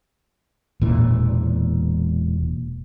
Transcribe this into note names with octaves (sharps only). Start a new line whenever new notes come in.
E1 A#2 E3